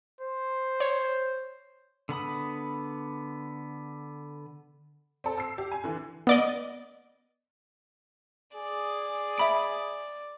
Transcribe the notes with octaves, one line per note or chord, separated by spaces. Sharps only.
C5
C#5
D3 B3 B5 D#6
C4 A4
E6 C7
G4
G#5
D3 E3
B3 D5 D#5
G#4 D5
E5 B5 D7